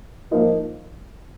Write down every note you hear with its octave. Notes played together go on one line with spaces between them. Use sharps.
F3 A#3 D#4 A#4